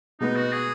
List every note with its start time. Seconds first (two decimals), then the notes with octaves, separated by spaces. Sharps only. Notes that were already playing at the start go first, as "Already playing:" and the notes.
0.20 B2 G#3 B3 D#4
0.36 F#4
0.52 G#4